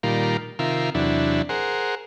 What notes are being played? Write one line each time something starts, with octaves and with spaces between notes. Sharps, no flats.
A#2 D#3 G3 F4 A#4
C3 D#3 F4 A#4 E5
E2 C3 F#3 D4 E4
G#4 A#4 C5 F#5